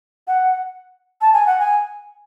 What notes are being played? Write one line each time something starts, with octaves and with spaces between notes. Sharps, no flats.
F#5
A5
G#5
F#5
G#5